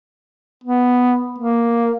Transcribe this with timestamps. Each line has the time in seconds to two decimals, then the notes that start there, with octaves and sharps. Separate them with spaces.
0.64 B3
1.39 A#3